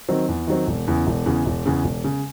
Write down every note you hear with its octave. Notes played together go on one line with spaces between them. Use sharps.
D#3 F#3 C4
E2
D#3 F#3 C4
E1
E2 C#3
E1
E2 C#3
E1
E2 C#3
E1
C#3